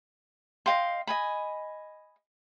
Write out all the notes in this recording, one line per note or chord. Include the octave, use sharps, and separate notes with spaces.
D#5 F5 G5 C6
D#5 G#5 B5